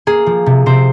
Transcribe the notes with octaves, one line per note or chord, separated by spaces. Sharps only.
A#3 G#4
F3
C3
C3 C5